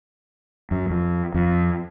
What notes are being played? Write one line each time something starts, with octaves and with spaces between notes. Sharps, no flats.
F#2
F2
F2